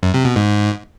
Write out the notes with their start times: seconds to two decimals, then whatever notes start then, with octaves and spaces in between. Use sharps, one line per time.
0.03 F#2
0.14 C3
0.25 B2
0.36 G#2